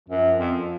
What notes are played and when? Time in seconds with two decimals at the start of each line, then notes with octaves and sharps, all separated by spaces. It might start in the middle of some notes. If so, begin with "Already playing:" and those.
0.08 F#2 F3
0.39 F2